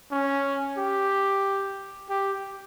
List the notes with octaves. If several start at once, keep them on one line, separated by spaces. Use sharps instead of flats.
C#4
G4
G4